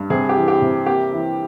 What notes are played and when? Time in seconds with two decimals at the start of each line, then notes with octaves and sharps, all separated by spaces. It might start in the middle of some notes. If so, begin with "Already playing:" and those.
Already playing: G2
0.10 C3 G#4
0.29 G4
0.36 E3
0.48 G4
0.62 C3
0.86 A#3 G4
1.12 E3